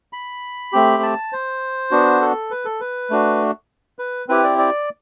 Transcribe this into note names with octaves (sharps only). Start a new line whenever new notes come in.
B5
A3 C4 G4
A5
C5
B3 D4 F#4
A4
B4
A4
B4
A3 D4 F#4
B4
C4 E4 G4 B4
D5
D5